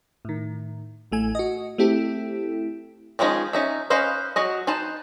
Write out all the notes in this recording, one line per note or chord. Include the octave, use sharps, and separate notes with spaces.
A2 D#3
A1 A3 G#5
F#4 D#5
A3 C4 E4 G4 A4
D#3 F3 G#3 C#4 D#4
C#4 D#4 E5
C#4 B4 C5 D#5 F5
F#3 F#4 D#5
D#4 B4 C5 A5